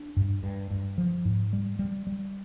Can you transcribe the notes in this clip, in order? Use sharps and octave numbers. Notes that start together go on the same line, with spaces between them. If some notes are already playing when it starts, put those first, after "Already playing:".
Already playing: D4
G2
G2
G2
F3
G#2
G3
G3
G3